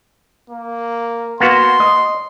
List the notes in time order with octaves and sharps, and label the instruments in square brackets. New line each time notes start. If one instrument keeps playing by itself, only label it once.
[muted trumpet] A#3
[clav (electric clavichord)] A#3 B3 F#4 [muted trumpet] C6
[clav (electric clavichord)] D#5